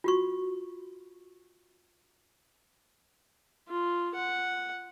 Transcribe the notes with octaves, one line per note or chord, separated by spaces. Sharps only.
F4 F#4 C#6
F4
F#5